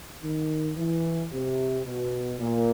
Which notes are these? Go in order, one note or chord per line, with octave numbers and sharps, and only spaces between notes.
D#3
E3
C3
B2
A#2